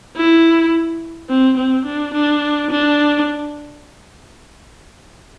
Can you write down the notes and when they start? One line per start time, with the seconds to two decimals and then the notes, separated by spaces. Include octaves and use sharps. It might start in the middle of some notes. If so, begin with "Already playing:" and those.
0.16 E4
1.30 C4
1.57 C4
1.85 D4
2.14 D4
2.70 D4